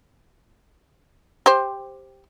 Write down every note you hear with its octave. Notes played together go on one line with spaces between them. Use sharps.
G4 C5